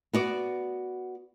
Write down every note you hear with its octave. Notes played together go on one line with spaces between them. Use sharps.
B3 F#4 D5